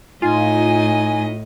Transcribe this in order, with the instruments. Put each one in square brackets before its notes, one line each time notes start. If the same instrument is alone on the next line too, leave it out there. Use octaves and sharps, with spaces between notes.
[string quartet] A2 D#5 [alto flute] D#4 [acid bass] F4 [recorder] G#5